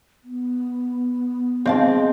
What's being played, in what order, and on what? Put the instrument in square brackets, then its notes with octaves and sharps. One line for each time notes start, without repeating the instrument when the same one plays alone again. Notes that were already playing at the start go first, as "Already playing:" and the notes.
[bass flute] B3
[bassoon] G#3 [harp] C4 [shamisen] C5 F5 A5